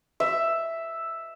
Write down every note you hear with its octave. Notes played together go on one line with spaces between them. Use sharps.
E5